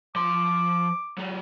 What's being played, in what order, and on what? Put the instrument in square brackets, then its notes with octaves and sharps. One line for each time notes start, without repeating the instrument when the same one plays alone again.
[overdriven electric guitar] F3 C6 [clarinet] D6
[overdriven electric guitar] F#3 G4